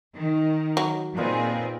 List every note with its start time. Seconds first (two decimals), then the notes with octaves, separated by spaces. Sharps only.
0.15 D#3
0.77 F#3
1.17 A#2 C4 D#4 F4 G#4 B4